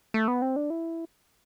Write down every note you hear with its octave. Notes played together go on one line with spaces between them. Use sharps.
A3
B3
C4
D4
E4